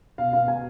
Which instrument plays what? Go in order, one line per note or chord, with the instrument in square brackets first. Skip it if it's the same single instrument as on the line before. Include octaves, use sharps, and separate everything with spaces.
[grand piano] B2 F5
B3 F5
B2 G#5